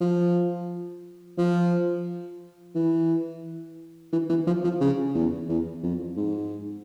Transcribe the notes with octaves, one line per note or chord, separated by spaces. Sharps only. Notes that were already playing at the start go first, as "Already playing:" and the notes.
F3
F3
E3
E3
E3
F3
F3
C#3
E2
E2
F2
G#2